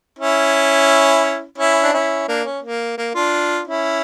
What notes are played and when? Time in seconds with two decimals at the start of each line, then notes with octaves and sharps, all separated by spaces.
0.19 C#4 E4
1.58 C#4 E4
1.83 D4
1.93 C#4 E4
2.28 A#3 D4
2.44 C#4
2.62 A#3
2.98 A#3
3.14 D4 F4
3.67 C#4 E4